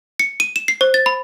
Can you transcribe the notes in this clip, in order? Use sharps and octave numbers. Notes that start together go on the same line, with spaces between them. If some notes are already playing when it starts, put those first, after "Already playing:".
C#7
D#7
E7
C7
C5
A6
B5